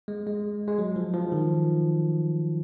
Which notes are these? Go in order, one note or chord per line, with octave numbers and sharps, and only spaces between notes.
G#3
G#3
G#3
F#3
F3
F3
D#3